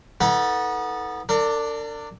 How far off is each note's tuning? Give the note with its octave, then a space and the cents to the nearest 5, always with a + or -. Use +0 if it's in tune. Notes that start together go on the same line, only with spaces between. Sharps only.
B3 -10 D#4 +45 A4 +0
D4 +0 A#4 -45